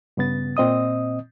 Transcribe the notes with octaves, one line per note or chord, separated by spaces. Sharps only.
G2 C#3 B3 A6
A#2 C4 D#5 D#6